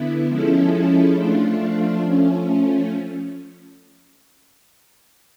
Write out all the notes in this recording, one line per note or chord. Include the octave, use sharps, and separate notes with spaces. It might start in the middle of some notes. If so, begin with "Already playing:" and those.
Already playing: D3 B3 E4
F3 G#3 C#4 E4 A4
F3 A3 D4 F4
F3 A3 C#4